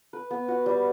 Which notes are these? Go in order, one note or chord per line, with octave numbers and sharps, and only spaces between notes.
B4
B3
F#4
G3